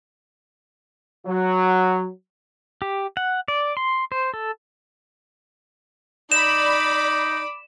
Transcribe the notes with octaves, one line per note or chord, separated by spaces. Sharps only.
F#3
G4
F#5
D5
C6
C5
A4
D#4 D5 B5 D6 E7